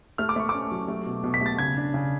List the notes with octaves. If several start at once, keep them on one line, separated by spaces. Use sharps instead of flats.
A3 F6
D6
A3 C#6
D6
C#4
F#3
A3
B2
B2
B6
A3 A6
C#3 G#6
D4
C#3